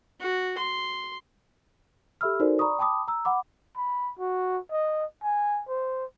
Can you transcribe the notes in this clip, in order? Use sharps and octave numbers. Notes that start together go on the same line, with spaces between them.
F#4
C6
G4 A4 E5 B5 E6 F6
D#4 F#4 A4 A#4 C5 D5
D5 A#5 B5 C#6 D#6
G5 A5 B5 D6 D#6
A#5 E6
F#5 B5 D6
B5
F#4
D#5
G#5
C5